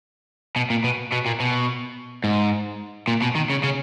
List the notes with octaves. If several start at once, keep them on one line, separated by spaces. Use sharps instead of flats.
B2
A#2
B2
B2
A#2
B2
G#2
A#2
B2
D#3
C#3
C#3